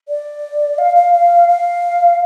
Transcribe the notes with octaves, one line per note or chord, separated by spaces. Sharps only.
D5
F5
F5
F5
F5